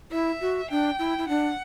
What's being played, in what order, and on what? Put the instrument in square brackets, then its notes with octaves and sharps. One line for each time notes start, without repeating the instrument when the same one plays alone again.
[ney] E4 [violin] E5
[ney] F#4
[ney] D4 [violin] G5
[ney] E4
E4
[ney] D4 [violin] F#5